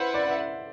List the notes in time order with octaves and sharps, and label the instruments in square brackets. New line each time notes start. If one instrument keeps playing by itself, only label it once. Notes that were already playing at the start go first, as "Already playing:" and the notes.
Already playing: [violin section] E4 B4 F#5 [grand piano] C5
[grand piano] D5
E5